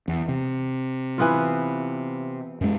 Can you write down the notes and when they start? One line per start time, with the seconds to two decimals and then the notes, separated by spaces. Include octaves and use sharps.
0.08 E2
0.28 C3
1.18 E3 B3 F4
2.61 F#2 G#3